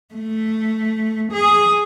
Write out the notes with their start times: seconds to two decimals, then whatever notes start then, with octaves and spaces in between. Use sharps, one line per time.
0.14 A3
1.32 G#4